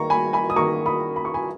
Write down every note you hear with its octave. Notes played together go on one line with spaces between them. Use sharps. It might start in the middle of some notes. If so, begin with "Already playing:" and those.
Already playing: D#3 A#3 A#5 C#6
G#5 B5
G#5 B5
D#6
D#3 A#3 A#5 C#6
B5 D#6
B5
C#6
G#5 B5